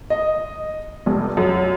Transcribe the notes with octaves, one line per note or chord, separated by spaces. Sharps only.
D#5
F1
F#2